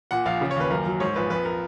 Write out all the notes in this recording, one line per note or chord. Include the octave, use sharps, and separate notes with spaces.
A#2 F#5
A#1 F5
C#3
C#5
D#2 B4
F#2 A#4
F#3
G#2 C#5
A#1 B4
F2 B4
A#4